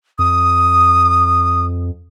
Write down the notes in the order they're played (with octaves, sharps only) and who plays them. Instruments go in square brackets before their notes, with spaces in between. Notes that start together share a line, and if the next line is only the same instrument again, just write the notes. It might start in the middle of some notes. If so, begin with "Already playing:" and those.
[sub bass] F2 [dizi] D#6